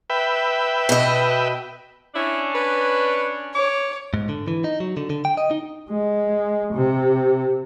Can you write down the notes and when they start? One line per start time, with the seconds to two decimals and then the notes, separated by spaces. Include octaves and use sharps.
0.10 B4 E5 G5
0.89 B2 D#5
2.15 C#4 D4 E4
2.55 B4
3.55 C#5 D6
4.14 G#2
4.29 D3
4.48 E3
4.64 D#4
4.80 F#3
4.97 D3
5.10 D3
5.25 G5
5.37 D#5
5.51 D#4
5.90 G#3
6.73 C3